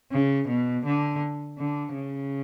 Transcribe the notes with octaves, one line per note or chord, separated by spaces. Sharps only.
C#3
B2
D3
D3
C#3